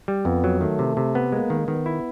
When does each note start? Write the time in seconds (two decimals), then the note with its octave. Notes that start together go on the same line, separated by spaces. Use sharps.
0.08 G3
0.25 F2 B3
0.44 F#3
0.61 D#3 A3
0.79 C3
0.97 C3
1.15 B3
1.32 G#3 A#3
1.50 D#3
1.68 D#3 B3
1.86 E4